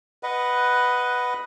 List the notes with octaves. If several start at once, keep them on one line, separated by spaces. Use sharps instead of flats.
B4 D#5 F#5